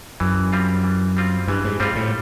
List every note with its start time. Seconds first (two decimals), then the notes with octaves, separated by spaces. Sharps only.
0.20 F#2 E3
0.52 G3 C4 F4
0.84 E3
1.17 G3 C4 F4
1.48 G2 E3
1.64 G#2
1.80 G#2 G3 C4 F4
1.96 A2